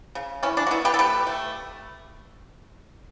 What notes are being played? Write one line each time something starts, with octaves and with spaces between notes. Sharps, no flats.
C#3
E3 C#4
D4
F#4
B3 C#4 E4
G4 B4
A4
A3 G4 B4
A3